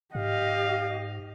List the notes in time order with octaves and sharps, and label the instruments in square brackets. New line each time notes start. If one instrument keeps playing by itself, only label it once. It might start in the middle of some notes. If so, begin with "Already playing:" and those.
[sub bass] G#2 [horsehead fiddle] G4 D#5 [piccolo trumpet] F5